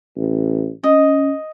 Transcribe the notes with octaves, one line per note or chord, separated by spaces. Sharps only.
A1
C#4 D#5